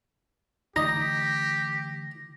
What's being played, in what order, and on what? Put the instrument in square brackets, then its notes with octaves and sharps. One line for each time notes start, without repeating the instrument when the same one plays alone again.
[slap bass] D3 E3 A3 [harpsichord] D#4 D#5 [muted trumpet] G4 [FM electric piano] A#6